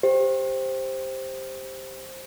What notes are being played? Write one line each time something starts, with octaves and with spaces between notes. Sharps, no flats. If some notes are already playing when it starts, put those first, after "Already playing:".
G4 C5